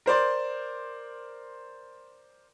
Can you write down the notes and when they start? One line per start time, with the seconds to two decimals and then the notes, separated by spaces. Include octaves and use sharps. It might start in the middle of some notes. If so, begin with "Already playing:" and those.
0.06 A#4 C5 D5 C6